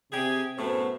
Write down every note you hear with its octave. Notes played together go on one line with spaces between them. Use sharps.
C3 G4 G#4
F#2 A2 A3 B3 F#4 C5